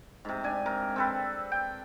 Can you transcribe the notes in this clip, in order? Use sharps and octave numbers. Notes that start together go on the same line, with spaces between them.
G#2 C3
D4 G#5
C3 A#4
C4 A4 B4
G5